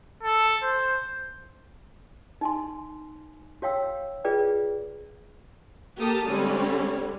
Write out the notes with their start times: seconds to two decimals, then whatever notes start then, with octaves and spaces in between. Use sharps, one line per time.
0.23 A4
0.63 C5
2.41 D#4 G#5 C6
3.62 F#4 C#5 F5 G5 E6
4.24 F4 G#4 B4 D5 G5
5.97 A#3 G4 A4 A#4 A5 D#6
6.27 D3 G3 G#3 C4 C#4